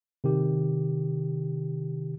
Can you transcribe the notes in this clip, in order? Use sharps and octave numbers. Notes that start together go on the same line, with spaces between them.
C3 D#3 G4